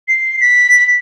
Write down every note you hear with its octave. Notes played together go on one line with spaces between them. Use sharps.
C7
B6